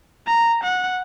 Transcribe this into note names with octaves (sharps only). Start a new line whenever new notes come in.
A#5
F#5